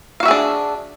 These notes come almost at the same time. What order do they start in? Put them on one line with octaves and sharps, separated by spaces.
F5 F#4 E5 G#4 D4